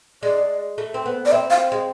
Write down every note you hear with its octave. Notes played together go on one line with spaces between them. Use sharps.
G#3 D5
A3
C4
B3
D5
C4 E5
F5
G#3